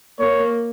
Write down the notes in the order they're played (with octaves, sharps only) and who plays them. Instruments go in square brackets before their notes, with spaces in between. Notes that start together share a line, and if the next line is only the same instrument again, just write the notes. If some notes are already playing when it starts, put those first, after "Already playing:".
[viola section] A#3 [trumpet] C#5